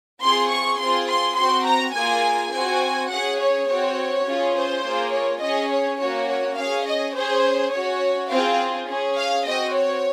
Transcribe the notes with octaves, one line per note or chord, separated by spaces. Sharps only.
C4 F4 G#4 C6
C#6
C4 F4 G#4 C6
C6
C4 F#4 C6
A#5
A#3 F4 G#4 G#5
C4 F#4 G#5
C#4 G#4 F#5
C#5
C4 F#4 C#5
C#4 F4 G#4
C5
A#3 F4 G#4
C#5
C#4 G#4 D#5
C#5
A#3 C#4 F#4 C#5
C#5
C#4 G#4 F5
D#5
C#4 G#4 C5
C#4 F#4 C#5
C4 F4 G#4 F5
C#4 G#4
F5
C4 F#4 D#5
C#5